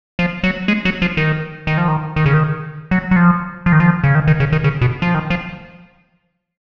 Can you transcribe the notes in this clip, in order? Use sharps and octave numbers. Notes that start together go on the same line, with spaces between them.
F3
F#3
G#3
F#3
F3
D#3
D#3
F3
D#3
D#3
C#3
D#3
F#3
F#3
F3
F3
D#3
F3
C#3
D#3
D#3
C#3
D#3
C#3
B2
F3
D#3
F3